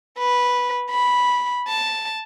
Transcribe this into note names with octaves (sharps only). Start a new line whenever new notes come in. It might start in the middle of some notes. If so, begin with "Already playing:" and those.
B4
B5
A5